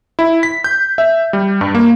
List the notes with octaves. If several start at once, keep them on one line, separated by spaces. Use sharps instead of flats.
E4
B6
G6
E5
G3
G2
A#3